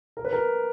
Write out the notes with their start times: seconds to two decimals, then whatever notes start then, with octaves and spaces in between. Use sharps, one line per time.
0.17 A#4
0.25 B4
0.33 A#4